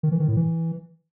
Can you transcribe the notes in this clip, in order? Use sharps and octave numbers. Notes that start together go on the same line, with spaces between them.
D#3
E3
D#3
A2
E3